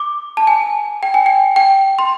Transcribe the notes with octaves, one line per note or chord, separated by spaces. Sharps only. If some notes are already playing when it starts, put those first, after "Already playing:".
Already playing: D6
A5
G#5
G5
G#5
G5
G5
C6